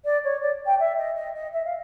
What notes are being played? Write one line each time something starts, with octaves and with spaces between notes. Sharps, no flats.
D5
C#5
D5
G5
E5
D#5
D#5
D#5
E5
F5